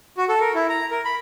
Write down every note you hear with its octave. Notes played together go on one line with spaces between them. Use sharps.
F#4
A4
A#4
E4
A#5
A#4
B5